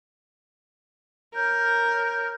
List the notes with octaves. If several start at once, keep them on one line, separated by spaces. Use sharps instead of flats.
A#4 C#5 F6 G6